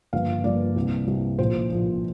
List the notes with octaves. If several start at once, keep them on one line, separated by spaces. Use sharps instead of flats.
G1 G2 F3 A#3 F5
G1 G2 F3 A#3 D5
C2 C3 A#3
C2 C3 A#3
A#1 A#2 F3 C5
A#1 A#2 F3